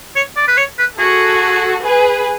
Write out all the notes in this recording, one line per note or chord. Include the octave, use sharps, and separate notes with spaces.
C#5
D5
B4
C#5
B4
F#4 G#4 A4
G#4 B4